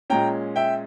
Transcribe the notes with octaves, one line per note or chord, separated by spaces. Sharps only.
A#2 G#3 C#4 G5 A#5
E5 G5